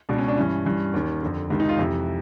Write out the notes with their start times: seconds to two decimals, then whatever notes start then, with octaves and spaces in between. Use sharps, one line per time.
0.09 C#2 B2 D4
0.18 C#4
0.28 D4
0.37 G2 E3 C#4
0.65 G2 E3
0.94 D#2 D#3
1.22 F2 D3
1.50 C#2 C3 D#3
1.60 D#4
1.69 F4
1.79 F2 C3 E3